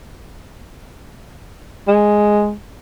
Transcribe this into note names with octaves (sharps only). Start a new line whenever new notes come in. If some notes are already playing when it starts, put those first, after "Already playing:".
G#3